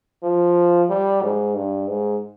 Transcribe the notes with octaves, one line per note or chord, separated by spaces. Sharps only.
F3
G3
G#2
G2
G#2